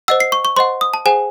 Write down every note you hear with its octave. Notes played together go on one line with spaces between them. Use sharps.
C5 D#5 F#5 E6
C7
C#6
C#6
C5 D#5 F#5 C6
D#6
A5
G#4 C5 F#5 G#5